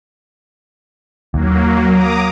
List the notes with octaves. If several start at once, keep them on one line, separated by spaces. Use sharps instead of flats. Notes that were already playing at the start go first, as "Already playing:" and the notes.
D#2 F#3 A#3
A#5 D6 D#6